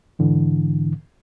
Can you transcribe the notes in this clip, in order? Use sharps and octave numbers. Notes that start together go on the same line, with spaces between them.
G#2 D3 E3